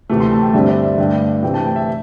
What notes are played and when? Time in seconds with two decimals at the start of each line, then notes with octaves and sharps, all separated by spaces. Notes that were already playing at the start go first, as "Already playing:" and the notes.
0.09 D2 C3 E3 A3 A5
0.20 C6
0.32 A5
0.42 G5
0.53 G2 D3 G3 C4 E5
0.69 D5
0.84 E5
0.98 G2 D3 A3 G5
1.42 C3 E3 A3 C4 G5
1.54 A5
1.65 G5
1.76 E5